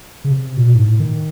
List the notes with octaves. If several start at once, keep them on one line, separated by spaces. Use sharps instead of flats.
C#3
C3
A#2
B2
G#2
A2
D#3